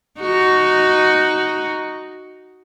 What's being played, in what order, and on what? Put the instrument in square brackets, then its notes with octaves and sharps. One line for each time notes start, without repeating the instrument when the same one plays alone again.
[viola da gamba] D#4 F#4